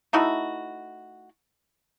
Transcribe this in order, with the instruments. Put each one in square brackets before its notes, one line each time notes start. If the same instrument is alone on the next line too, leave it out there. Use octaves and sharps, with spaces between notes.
[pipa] A3 D#4 E4 F#4